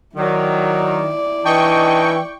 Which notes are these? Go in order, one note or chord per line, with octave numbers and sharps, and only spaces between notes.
D#3 F#3 E4 D5
E3 D4 D#4 D#5 G5 C#6